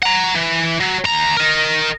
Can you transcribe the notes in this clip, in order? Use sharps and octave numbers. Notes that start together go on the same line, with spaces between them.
F#5 A#5
E3
F#3
D#2 A#5
A#4 D#5